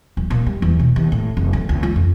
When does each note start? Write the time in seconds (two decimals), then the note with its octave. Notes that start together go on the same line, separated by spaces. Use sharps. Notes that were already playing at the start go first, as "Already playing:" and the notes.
0.17 D1
0.30 A#2
0.46 G3
0.62 E2
0.79 B2
0.96 D#2
1.12 A2
1.37 F1
1.53 D2
1.69 C#2
1.83 F4
1.96 F2